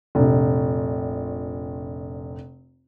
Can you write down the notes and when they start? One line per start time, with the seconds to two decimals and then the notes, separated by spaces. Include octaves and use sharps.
0.15 F1 A#1